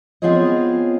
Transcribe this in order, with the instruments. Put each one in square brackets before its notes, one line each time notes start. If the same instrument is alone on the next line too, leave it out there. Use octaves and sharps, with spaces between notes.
[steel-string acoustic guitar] B3 C4 F4 G#4 C#5 D#5